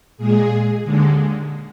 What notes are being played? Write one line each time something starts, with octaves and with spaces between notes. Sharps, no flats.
A#2 G#3 G#4
D#2 D3 G#3